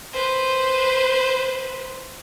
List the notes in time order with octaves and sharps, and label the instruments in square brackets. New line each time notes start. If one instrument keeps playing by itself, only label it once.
[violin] B4 C5